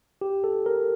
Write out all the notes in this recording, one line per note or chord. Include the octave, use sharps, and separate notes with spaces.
G4
A4
A#4